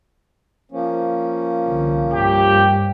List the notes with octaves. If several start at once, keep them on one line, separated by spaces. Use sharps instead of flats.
F3 A#3 C#4
C2 D3
G2 G4